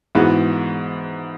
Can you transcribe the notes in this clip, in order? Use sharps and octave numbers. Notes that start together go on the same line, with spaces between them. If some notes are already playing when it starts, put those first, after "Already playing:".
G#2 E3 B3 F#4